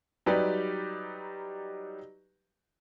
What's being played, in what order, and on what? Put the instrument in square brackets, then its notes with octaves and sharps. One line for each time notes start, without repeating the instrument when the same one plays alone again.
[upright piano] F#3 G3 D#4 G4 B4 D5